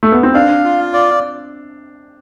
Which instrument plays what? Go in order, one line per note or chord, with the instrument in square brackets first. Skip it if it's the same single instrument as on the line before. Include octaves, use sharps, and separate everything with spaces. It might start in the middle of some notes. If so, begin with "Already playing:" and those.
[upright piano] A3
B3
C4
[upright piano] D4 [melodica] F5
[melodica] F4
D5